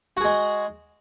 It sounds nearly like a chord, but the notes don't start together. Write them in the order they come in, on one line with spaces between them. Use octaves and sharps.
F#4 G#4 G#3